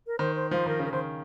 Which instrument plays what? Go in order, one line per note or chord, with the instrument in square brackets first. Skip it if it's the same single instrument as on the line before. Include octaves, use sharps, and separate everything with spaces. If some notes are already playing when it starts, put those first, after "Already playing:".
[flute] A#4
[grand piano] D#3 [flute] C5
[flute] C5
[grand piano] F3 [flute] C5
[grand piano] D#3 [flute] A#4
[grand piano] C#3
[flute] A#4
[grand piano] D#3 [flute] C5